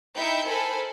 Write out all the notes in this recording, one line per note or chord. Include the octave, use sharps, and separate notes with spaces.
D#4 E4 E5 G5 G6 C#7
A4 A#4 C5 G#5 B5